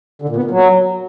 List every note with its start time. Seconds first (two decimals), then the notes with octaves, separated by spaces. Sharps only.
0.22 D3
0.29 A#2
0.36 B3
0.44 A#2
0.51 F#3